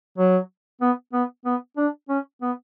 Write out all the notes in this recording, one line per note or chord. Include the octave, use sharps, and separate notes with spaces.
F#3
B3
B3
B3
D4
C#4
B3